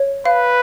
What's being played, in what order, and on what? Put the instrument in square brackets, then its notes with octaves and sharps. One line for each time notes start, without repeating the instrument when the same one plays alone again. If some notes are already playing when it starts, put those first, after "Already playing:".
Already playing: [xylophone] C#5
[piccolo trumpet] B4 [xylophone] F5